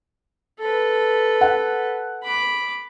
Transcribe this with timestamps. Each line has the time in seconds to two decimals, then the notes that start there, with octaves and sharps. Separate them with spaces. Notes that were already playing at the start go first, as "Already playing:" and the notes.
0.59 A4 B4
1.41 F#5
2.23 B5 D6